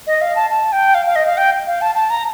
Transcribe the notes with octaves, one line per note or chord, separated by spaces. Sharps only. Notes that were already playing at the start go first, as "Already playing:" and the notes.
D#5
F5
A5
A5
G5
F5
F5
D#5
F5
G5
F5
A5
A5
A#5